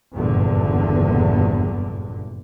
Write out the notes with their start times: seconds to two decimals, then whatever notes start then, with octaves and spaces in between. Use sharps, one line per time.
0.14 F#1 E2 G2 A#2 D3